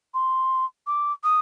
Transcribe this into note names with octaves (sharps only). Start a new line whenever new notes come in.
C6
D6
D#6